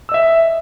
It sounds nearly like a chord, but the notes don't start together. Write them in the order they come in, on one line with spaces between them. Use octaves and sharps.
E6 D#5 E5